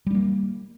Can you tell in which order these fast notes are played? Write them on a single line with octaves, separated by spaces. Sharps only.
G3 D4 A#3